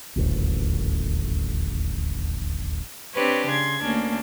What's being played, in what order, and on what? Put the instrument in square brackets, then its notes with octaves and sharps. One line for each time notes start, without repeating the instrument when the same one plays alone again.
[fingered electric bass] D#1 A1 D2
[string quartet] C4 D4 G4 B4 C#5
C#3 C6 G#6
D2 A#3 C#4 D4